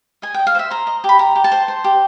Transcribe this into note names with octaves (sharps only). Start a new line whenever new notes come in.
D#5 G#5
D#5 G5
F5
C5 E5
C5 A#5
D#5
G4
B5
G4 A#5
G4
A5
C5
C5
G4